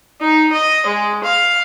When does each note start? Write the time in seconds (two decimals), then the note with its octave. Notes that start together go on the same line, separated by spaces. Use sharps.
0.21 D#4
0.52 D#5
0.86 G#3
1.24 F5